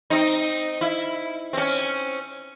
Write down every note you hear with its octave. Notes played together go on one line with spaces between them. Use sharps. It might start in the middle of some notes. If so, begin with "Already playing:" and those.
C4 D#4
E4
C4 C#4